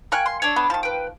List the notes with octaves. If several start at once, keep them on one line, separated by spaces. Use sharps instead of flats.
A#4 F5 G5 G#5 C#6 F#6
C6
D4 A4 C#5
B3
D#3 F3 A5
B4 G5